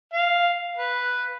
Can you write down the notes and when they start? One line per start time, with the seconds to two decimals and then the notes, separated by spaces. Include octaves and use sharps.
0.13 F5
0.77 B4